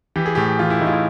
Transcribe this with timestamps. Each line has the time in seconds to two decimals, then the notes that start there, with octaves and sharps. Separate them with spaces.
0.16 E3 G4
0.26 G#4
0.35 A2 G4
0.59 E3 F4
0.70 E4
0.81 A2 D#4
0.87 F4
0.93 E4